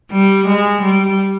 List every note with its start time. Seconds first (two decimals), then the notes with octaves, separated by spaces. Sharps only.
0.12 G3
0.47 G#3
0.83 G3